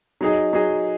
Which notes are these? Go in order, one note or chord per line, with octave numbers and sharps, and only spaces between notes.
F#3 D#4 G#4 D#5
F#3 D#4 G#4 D#5